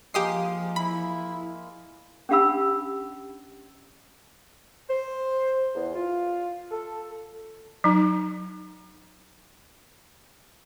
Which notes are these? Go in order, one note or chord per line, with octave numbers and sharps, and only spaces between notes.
F3 G#3 A#3 G4 D#6 C7
E4 B5
C#4 D4 G4 F5 B5 E6
C5
E2
F4
A4
F#3 D#4